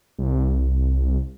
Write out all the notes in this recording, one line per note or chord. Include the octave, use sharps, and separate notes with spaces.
C2